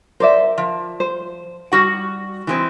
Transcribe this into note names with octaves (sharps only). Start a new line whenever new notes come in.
A#4 C5 D5 E5
F3
C5
G3 F#4 F#5
E3 G#3 C4